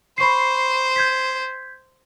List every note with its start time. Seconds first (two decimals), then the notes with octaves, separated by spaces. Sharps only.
0.18 C5 B5 C#6 C7
0.96 G6 G#6 B6